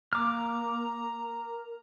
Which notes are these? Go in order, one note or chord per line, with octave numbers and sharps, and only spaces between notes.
A#3 A#5 D6 F6
A#4